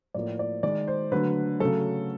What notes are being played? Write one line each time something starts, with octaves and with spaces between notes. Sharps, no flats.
A2 F3 A#3 D5
D5
D#3 G#3 D5
C5
D3 F#3 A3 B4
C#3 F#3 A3 A4